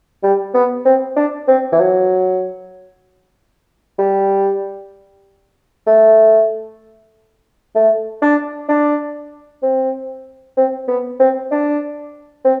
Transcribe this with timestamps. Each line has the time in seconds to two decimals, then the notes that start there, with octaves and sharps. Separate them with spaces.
0.23 G3
0.54 B3
0.85 C4
1.16 D4
1.48 C4
1.72 E3
1.80 F#3
3.99 G3
5.87 A3
7.75 A3
8.22 D4
8.69 D4
9.63 C4
10.57 C4
10.88 B3
11.20 C4
11.51 D4
12.45 C4